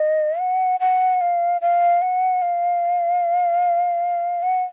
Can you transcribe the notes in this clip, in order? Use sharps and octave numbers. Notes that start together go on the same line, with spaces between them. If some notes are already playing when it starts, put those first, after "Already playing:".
Already playing: D#5
F#5
F#5
F5
F5
F#5
F5
F#5